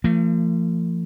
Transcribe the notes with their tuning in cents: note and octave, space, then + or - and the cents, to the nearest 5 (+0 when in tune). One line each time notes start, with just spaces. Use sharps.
F3 -30 A3 +45